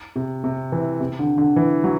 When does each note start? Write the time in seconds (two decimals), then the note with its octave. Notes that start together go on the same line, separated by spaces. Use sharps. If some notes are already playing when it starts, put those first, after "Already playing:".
0.16 C3
0.44 C3
0.72 E3
1.00 C3
1.19 D3
1.38 D3
1.56 E3
1.84 F#3